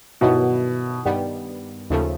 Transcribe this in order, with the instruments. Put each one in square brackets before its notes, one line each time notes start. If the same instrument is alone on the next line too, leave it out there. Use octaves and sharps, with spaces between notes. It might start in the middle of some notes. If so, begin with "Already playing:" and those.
[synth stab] G2 D#3 F#3 B3 E4 [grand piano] B2
[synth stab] G2 D#3 G3 B3
D#2 C#3 F3 A3